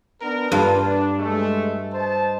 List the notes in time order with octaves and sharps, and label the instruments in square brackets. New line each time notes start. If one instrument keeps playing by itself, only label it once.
[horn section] B3 D4 A#4
[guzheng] G2 [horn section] A#3 D4 F4
[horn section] D4
G#3 A3
C5 D#5 A5